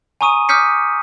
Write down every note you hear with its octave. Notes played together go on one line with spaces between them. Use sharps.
G#5 A#5 C#6 D#6 D#7
D6 D#6 F6 G6 B6 C#7